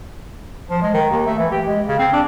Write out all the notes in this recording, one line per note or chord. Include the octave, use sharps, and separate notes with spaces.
F3
G#3
D#3
D#2
A3
E3
G4
G#3
C#3
C4
D4